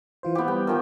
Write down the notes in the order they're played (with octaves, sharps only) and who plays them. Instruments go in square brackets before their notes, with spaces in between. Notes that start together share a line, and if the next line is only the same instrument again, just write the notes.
[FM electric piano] E3 F4 C5
[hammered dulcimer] B3 G4
[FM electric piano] G3 [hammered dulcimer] G5
[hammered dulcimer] D#3 F3 G5